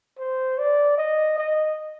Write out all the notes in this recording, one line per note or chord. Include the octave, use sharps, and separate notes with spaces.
C5
D5
D#5
D#5